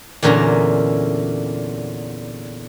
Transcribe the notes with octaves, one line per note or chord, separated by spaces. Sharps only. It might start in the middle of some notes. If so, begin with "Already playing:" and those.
E2 A#2 D3 C#4 A#5